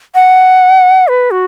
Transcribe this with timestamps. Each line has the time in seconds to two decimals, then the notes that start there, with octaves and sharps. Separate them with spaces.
0.15 F#5
1.08 B4
1.31 F#4